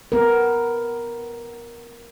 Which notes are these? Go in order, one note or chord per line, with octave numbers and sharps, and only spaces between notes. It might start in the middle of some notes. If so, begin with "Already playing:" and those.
B3 A#4